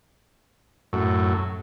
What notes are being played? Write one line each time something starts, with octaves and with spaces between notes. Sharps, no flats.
F#2 A2